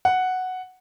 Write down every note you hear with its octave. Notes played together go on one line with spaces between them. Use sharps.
F#5